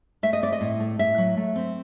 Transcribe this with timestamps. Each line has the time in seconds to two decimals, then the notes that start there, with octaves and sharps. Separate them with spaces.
0.23 A3 E5
0.33 D#5
0.42 C4 D5
0.52 D#5
0.61 A2
0.80 A3
0.99 A2 E5
1.18 F#3
1.37 A3
1.56 C4